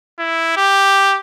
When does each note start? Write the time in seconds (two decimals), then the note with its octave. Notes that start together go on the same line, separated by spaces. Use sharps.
0.19 E4
0.57 G4